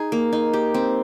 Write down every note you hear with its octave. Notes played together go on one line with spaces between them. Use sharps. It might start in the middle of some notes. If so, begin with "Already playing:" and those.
Already playing: D#4 G#4
A#3
D#4
G4
C4